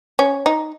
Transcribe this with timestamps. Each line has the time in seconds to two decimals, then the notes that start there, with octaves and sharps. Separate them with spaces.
0.19 C#4
0.46 D#4